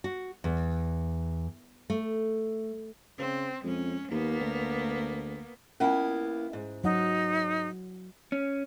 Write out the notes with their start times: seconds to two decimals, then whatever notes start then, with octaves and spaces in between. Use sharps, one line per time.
0.04 F#4
0.44 E2
1.90 A3
3.19 C#3 C4
3.64 F2 G#3 C#4
4.11 D#2 A#3 B3
4.40 D2
5.80 A#3 B3 C#4 E4 F4 G#5
6.53 G#2
6.84 F#3 D#4 F#5
8.32 C#4